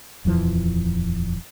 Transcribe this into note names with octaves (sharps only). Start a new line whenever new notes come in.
D#1 F2 E3 F3